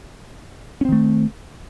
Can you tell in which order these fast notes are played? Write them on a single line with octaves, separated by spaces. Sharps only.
C#4 C4 D#3 A3